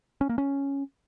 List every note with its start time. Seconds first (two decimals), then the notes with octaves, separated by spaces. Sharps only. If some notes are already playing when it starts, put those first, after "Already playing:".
0.21 C#4
0.29 A#3
0.38 C#4